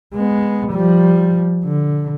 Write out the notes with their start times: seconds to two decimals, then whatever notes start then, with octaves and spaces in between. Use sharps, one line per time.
0.14 G#3 B3
0.72 F3 G3
1.64 D3